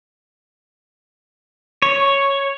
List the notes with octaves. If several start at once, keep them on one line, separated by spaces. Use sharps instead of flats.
C#5